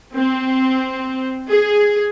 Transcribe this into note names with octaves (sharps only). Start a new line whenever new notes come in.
C4
G#4